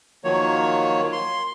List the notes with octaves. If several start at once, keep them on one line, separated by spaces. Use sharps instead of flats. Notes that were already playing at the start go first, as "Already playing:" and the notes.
D#3 F3 F#3 A#3 C#5
C6